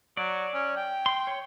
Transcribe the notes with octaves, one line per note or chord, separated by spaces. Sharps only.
F#3 D5
C#4
G5
C6
C#5